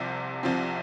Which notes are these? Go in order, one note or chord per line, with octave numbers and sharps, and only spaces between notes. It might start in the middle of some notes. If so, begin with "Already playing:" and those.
Already playing: C2 C3 F3 C4
C2 C3 F3 C4